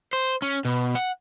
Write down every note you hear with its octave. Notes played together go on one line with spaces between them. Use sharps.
C5
C#4
B2
F#5